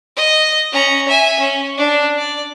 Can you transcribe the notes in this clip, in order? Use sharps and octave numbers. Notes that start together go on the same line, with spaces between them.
D#5
C#4 A#5
E5 G#5
C#4
D4
D5